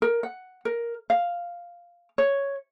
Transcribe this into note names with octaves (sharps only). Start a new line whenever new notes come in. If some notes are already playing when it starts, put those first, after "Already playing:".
A#4
F#5
A#4
F5
C#5